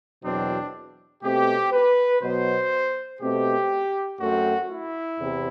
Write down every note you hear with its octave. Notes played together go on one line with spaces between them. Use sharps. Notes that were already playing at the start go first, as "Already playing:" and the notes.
E2 B2 F#3 C4 D4
B2 A3 C4 G4
B4
B2 F#3 B3 C5
B2 A3 C4 G4
F#2 F#3 A3 C4 F#4
E4
E2 C3